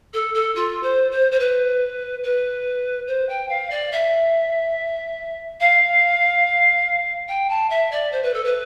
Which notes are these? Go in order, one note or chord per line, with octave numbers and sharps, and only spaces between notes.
A4
A4
F4
C5
C5
C5
B4
B4
C5
G5
F5
D5
E5
F5
G5
A5
E5
D5
C5
B4
A4
B4